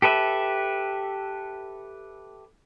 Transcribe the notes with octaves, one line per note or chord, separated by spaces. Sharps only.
G4 A4 B4 E5